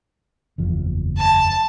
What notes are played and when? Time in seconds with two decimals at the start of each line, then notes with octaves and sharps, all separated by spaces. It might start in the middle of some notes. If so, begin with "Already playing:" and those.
0.58 F#1 E2 F3
1.18 A5